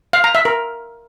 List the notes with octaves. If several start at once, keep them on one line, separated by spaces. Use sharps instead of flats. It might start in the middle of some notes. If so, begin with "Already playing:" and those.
F5
A#5
E5
A#4